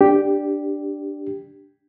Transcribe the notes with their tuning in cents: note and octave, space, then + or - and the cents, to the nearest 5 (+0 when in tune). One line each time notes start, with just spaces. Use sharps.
D4 +0 G4 +0